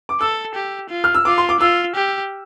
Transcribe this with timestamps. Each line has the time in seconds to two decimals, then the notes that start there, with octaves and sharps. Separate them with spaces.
0.09 D6
0.21 A4 E6
0.55 G4
0.90 F4
1.04 F6
1.14 E6
1.25 F4 D6
1.38 C6
1.49 D6
1.60 F4 E6
1.95 G4